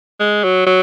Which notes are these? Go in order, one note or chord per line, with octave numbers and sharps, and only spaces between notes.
G#3
F#3
F#3